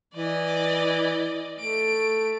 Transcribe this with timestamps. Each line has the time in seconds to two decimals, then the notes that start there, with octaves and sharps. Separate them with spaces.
0.15 E3 D5 D#5
1.60 A3 D7